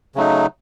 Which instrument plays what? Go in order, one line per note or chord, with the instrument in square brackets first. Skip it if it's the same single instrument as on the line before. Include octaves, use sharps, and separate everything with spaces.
[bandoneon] C#3 F#3 A3 D#4